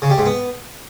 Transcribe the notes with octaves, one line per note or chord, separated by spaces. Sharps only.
C#3
G3
G#2
B3